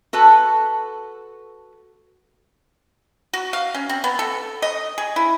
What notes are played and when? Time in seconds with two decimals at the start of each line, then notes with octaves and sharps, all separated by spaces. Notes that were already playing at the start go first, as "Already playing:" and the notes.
0.13 F#4 A4 B4 A5
3.33 F#4
3.53 F5
3.75 C#4
3.89 C4
4.04 B3
4.19 A4
4.62 D#5
4.98 G#4
5.16 E4